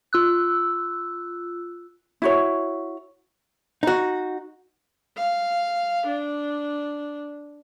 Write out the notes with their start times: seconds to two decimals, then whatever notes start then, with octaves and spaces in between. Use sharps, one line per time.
0.13 F4 E6 F#6
2.22 E4 F#4 C#5
3.83 D#4 F#4
5.17 F5
6.07 D4